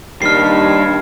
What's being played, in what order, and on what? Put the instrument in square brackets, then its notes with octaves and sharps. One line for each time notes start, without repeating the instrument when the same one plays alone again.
[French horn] D#2 [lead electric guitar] G3 D4 [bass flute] D#4 [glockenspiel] F6 C7